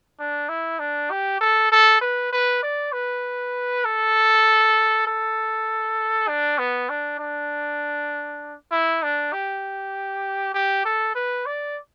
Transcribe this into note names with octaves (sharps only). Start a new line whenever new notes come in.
D4
E4
D4
G4
A4
A4
B4
B4
D5
B4
A4
A4
D4
B3
D4
D4
E4
D4
G4
G4
A4
B4
D5